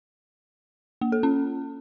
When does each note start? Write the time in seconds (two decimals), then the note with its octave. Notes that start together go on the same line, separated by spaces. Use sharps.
1.01 A#3
1.12 A4
1.23 C#4